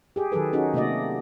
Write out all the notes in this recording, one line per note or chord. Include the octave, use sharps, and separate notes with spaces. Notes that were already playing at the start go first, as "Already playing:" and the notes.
G4 G#4
D#3 F#3 G#4 A4 B4
C#4 D#4 F#4 G#4
C3 A3 A#3 F#4 D5 D#5